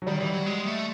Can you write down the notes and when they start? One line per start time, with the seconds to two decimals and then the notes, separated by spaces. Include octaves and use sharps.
0.02 F#3
0.07 D#3 G3
0.20 E3
0.33 F#3
0.46 G#3
0.66 A3